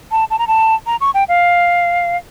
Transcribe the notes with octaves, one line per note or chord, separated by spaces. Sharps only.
A5
A5
A#5
A5
A#5
C#6
G5
F5